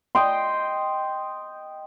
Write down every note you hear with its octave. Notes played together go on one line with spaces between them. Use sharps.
D#5 G5 C6